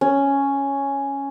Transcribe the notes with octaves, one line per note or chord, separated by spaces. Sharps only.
C#4